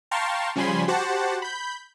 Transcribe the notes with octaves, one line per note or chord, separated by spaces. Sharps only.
F5 G5 A5 A#5 C6 C#6
C#3 F3 G3 G#5 B5 C6
F#4 G4 C5 F#5 A5
B5 G6